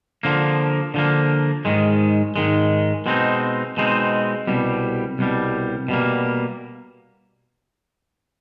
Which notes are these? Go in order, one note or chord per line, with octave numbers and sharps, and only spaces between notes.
D3 F3 A#3
D3 F3 A#3
G#2 D#3 G#3
G#2 D#3 G#3
B2 G#3 C4 D#4
B2 G#3 C4 D#4
C2 B2 G3
C2 B2 G3
B2 G3 A#3